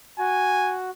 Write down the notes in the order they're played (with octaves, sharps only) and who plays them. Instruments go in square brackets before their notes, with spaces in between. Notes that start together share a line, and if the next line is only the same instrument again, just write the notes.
[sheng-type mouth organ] F#4 [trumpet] G#5